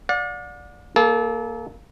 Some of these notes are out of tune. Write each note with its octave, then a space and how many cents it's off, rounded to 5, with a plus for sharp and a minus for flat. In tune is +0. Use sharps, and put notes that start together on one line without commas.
D5 +0 F#5 -45
A#3 +0 A4 -35